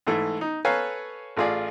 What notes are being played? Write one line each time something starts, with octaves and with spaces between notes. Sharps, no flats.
G#2 E3 A3
D#4
A4 B4 C#5 F5 G#5 A#5
A1 A3 F4 G#4 D5